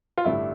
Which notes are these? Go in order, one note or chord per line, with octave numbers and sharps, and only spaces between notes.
F4
A1 G2 D3 G3 E4